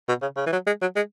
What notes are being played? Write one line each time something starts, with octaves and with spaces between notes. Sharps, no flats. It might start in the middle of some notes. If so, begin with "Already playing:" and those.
B2
C#3
C#3
E3
F#3
G#3
F#3
G#3